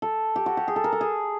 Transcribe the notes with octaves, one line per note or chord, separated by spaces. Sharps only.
A4
G4
F#4
G4
G#4
A4
A#4
A4
G#4